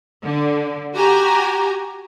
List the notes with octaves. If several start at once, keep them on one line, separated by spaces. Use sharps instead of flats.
D3
F#4 G4 G#5 A#5